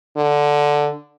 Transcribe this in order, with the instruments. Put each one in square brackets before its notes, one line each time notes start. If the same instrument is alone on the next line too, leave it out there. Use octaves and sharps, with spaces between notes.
[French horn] D3